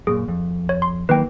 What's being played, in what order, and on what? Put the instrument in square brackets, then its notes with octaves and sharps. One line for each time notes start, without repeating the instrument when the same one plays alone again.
[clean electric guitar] F#2 A#2 [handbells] G#4
[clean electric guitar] F2
[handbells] C#5
C6
[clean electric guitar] D#3 F#3 A#3 [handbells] B4 G5